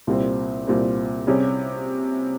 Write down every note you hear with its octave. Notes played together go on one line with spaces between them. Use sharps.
C2 A#2 G3 C4
C2 A#2 G3 C4
C3 G3 C#4 G#4